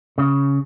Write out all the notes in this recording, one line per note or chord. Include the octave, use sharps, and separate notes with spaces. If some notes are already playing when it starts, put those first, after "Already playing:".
C#3